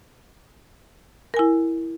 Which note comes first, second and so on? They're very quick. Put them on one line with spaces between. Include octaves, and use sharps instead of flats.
A#4 G#5 E4